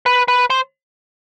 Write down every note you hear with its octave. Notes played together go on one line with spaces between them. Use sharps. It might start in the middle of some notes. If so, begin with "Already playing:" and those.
B4
B4
C5